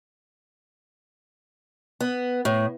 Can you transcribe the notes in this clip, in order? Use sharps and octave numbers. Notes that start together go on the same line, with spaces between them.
B3
A2